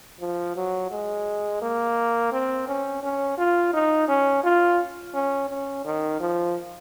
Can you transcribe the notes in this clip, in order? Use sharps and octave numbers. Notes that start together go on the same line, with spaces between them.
F3
F#3
G#3
A#3
C4
C#4
C#4
F4
D#4
C#4
F4
C#4
C#4
D#3
F3